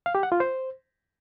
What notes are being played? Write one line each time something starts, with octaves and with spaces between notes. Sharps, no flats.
F5
G4
F#5
F4
C5